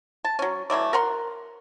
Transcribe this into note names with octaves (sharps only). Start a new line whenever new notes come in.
A5
F#3 C#4
E3 F#3 A3 D5
A#4 F#5 A#5 C6